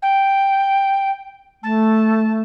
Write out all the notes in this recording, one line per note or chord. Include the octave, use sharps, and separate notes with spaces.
G5
A3 A5